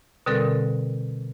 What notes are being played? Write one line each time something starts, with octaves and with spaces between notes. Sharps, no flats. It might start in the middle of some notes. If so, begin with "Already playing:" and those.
B2 D3 G3 C4 A4 A#4